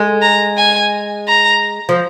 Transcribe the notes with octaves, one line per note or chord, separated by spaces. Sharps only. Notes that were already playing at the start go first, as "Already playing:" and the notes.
Already playing: G#3
A#5
G#5
A#5
F3